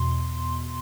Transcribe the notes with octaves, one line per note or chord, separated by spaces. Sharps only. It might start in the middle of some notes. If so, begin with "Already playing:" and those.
Already playing: E2 B2 C6